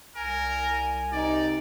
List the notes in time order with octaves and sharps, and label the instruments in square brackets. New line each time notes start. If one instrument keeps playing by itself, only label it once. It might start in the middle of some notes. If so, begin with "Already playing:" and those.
[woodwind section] C2 G#5 [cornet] A#4
[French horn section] C3 D#4 [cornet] D5